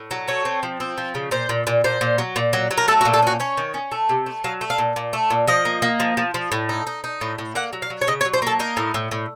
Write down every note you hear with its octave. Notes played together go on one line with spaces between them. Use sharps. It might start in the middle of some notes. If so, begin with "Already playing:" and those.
Already playing: A2
F#3
A3 C#5
C4
F3
C4
F3
C#3
A#2 C5
A#2
A#2
A#2 C5
A#2
F#3
A#2
F#3
F#3
A#4
A3 A4
F#4
A#2
A4
C#4 F#4
C#4 C#5
D#3
C#4
A3
C3
A3
F#3 F5
A3
F5
A#2
A#2
A3
A#2
F3 D#5
A#3
A#3
F3
F3
F3
A2
D#4
D#4
D#4
A2
A2
A#3 F#5
F#3
F5
F#3
C#5
C#3 D#5
C#5
F#3
C5
A#3 A4
D#4 A#4
A2
A2
A2